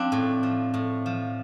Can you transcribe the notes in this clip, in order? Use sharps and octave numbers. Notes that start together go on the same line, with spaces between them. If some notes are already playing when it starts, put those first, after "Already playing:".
Already playing: F3 C4 D4
A2
F3
A2
F3